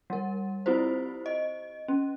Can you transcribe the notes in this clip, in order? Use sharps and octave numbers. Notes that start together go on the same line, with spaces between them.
G3 A#4
C4 E4 F4 G4 C5
D#5
C#4